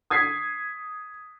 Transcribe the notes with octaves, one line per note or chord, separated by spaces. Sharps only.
D#6 G#6 B6 C7